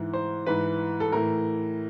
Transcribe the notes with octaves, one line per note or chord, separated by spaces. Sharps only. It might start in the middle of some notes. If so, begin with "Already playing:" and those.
Already playing: G#2 E3
C5
G#2 E3 B4
A4
A2 E3 A#4